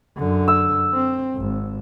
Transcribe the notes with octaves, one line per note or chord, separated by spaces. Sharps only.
F#2 D3
E6
C4
G#1